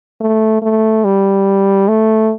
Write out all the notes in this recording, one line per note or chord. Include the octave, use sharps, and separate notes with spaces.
A3
A3
G3
A3